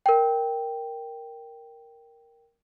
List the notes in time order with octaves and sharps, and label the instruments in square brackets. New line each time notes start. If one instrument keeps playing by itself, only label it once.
[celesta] A#4 G5